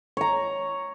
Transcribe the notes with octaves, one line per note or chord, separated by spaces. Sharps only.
C#5 A#5